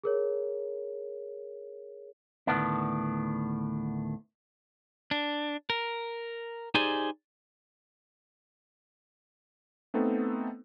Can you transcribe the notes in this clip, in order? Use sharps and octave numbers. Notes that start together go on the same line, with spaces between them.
G#4 A#4 C#5
D2 A2 D#3 B3 D4
D4
A#4
D#4 G4 G#4 C5 D5 G#5
A3 B3 C4 D#4 A4